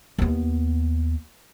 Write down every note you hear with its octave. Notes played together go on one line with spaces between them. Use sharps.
D#2 B3